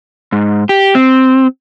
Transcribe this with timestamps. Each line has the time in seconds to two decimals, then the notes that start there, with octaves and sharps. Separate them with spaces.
0.32 G#2
0.69 G4
0.95 C4